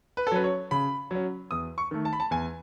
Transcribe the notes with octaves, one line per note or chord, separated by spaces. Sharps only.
B4
A4
F#3 C#4 B4
C#5
C#3 B5
F#3 C#4
E2 D#6
C#6
D#3 A3
A5
B5
A5
E2 G#5